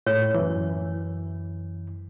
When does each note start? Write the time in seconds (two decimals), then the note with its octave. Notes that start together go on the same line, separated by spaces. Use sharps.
0.07 A2 C#5
0.34 F#2 E3